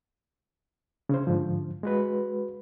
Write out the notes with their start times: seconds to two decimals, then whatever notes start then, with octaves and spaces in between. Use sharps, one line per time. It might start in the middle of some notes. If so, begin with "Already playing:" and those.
1.09 C#3 C#4 C5
1.27 G#2 D3 F3
1.83 G#3 F#4 B4